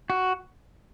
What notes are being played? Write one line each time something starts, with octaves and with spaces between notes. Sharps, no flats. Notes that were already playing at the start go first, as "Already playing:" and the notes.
F#4